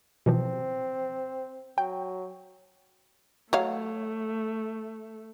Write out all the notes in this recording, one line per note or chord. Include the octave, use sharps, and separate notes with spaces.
B2 E3 F3 C4
F#3 G5
F#3 A3 C#5 F5